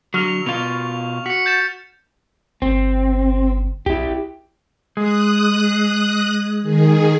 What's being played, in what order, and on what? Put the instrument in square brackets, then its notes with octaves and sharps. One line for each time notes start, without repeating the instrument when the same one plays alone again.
[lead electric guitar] D3 F#3 [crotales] C#6 F6 F7
[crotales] F7
[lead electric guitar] B2 F4 [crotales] F7
[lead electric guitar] F#4 [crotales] B6 C#7
[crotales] G6 A6 E7
[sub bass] G1 [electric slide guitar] C4
[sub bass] B1 [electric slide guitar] E4 G4
[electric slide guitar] G#3 [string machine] D#6 F#6
[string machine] D#3 G#4